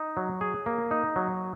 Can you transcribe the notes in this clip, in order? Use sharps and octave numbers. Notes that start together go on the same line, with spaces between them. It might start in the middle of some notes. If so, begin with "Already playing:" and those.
Already playing: D#4
F#3
G#4
A#3
D#4
F#3